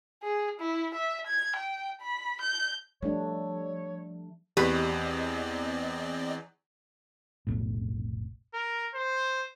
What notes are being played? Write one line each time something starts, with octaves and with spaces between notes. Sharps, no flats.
G#4
E4
E5
G#6
G5
B5
G6
F3 G3 A3 D4 C#5
E2 C4 G4 B4 D5 D#5
F1 B1 A2
A#4
C5